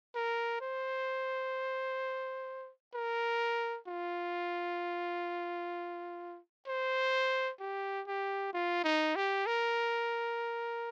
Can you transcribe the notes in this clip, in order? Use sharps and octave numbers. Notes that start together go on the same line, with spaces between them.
A#4
C5
A#4
F4
C5
G4
G4
F4
D#4
G4
A#4